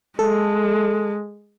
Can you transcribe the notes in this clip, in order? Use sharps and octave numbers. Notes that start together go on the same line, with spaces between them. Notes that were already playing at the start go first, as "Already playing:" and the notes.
G#3 A4